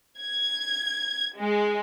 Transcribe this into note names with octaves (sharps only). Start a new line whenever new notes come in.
G#6
G#3